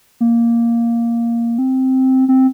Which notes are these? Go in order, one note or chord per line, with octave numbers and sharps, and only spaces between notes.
A#3
C4
C4